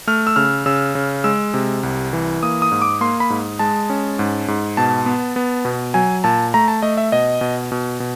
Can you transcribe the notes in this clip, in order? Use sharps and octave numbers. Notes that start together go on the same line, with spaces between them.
A3 F6
E6
C#3 F6
C#3 E6
C#3
G#3 E6
C3
C2
E3
A#3 D#6
D#6
G#2
D6
A#3 C6
B5
G#2
G#3 A5
C#4
G#2
G#2
B2 A5
B3
B3
B2
F#3 G#5
A#2 A5
A3 A#5
A5
A3 D#5
E5
B2 D#5
B2
B2
B2